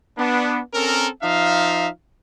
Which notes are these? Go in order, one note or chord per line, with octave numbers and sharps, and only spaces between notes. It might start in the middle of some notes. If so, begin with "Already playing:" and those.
B3 D4
C4 C#4 A4 A#4
F3 D#4 E5 F5